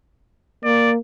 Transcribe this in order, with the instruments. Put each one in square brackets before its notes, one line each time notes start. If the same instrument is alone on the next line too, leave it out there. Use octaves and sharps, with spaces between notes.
[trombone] A#3 [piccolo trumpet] D5